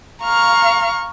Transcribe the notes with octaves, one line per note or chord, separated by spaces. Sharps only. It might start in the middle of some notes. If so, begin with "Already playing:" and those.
F5 A#5 C#6 F6